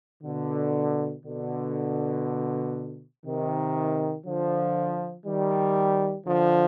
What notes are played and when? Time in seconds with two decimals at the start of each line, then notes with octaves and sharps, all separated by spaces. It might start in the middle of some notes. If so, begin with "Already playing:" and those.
0.24 B2 D3
1.24 B2 D3
3.25 C3 D#3
4.25 D3 F3
5.26 D#3 G3
6.26 D3 F3